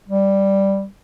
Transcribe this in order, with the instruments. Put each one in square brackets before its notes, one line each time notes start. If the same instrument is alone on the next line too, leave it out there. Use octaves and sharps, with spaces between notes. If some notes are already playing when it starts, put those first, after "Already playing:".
[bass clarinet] G3